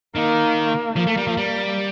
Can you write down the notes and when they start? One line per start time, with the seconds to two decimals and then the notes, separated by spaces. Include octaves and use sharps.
0.15 D#3 A#3
0.96 F3 A#3
1.07 A3
1.17 G3
1.27 F3
1.37 G3